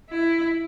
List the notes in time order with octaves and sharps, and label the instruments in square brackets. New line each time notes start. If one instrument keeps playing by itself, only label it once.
[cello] E4